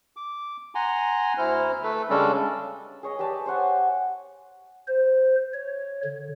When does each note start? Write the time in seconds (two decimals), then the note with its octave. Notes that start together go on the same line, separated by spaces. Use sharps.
0.16 D6
0.75 F#5 G#5 A#5 C6
1.38 D2 E4 C5 F6
1.83 A3 A4 B4
2.10 C#3 G3 G#3 C#4 D4 A4
3.03 G#4 C#5 D#5
3.19 G4 B4 D5 A5
3.46 C5 C#5 F#5 G#5
4.88 C5
5.53 C#5
6.04 D3